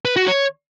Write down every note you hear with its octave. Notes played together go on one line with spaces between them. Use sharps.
B4
F#4
C#5